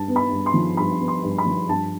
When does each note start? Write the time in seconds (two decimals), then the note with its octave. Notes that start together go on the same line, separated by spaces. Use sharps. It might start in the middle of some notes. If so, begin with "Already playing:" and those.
Already playing: G2 A5
0.08 B3
0.16 B5
0.31 G2
0.46 C6
0.54 F3
0.77 G2 B5
1.00 B3
1.08 C6
1.23 G2
1.38 B5
1.46 F3
1.68 G2 A5